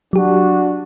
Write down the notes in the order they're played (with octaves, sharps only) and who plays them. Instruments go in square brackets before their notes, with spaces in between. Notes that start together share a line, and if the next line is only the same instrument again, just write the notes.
[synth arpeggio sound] F#3 G4 [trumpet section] D4 F#4